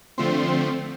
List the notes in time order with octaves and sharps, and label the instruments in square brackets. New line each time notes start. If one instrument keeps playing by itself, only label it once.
[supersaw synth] D3 F3 A3 C4 C6